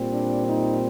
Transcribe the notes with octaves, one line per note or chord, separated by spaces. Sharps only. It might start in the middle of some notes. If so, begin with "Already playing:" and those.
Already playing: A#2 G3 C4
D4
D#4